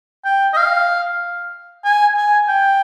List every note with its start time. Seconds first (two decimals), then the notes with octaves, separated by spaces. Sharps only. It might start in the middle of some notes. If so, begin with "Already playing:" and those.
0.25 G5
0.53 D#5
0.57 F5
1.84 G#5
2.16 G#5
2.48 G5